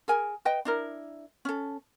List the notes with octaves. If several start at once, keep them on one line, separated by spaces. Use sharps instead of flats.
G#4 A#4 G#5
B4 D#5 G5
D4 E4 A#4
C#4 A4